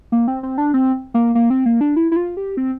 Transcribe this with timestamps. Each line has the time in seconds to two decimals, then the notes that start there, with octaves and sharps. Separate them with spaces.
0.12 A#3
0.28 C4
0.43 C4
0.58 D4
0.74 C4
1.14 A#3
1.35 A#3
1.50 C4
1.66 A#3
1.81 D4
1.96 E4
2.12 E4
2.16 F4
2.37 G4
2.57 C4